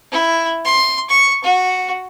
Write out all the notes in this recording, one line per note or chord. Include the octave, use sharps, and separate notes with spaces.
E4
C6
C#6
F#4